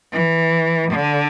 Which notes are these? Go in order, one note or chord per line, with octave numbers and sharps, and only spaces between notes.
E3
D3